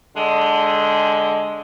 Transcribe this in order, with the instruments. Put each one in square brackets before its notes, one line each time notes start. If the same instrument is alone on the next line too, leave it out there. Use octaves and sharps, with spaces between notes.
[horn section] D3 G#3